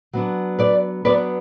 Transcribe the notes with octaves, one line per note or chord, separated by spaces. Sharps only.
F#3 B3 D4
B4 D5
F#3 B3 D4 B4 D5